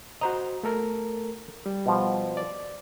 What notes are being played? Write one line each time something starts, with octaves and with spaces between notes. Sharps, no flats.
F#4 C5 D#5 A#5
A3 A4 A#4
G3
B2 F3
D5